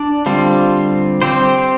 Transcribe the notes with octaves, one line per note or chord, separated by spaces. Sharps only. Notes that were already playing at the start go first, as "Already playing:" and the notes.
Already playing: D4 D5
D3 G3 C4 F4
C4 G4 C5